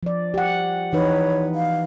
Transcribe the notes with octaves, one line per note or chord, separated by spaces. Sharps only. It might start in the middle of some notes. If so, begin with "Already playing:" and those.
F3 D5
G4 F#5
E3 D#4 B4 C#5
F5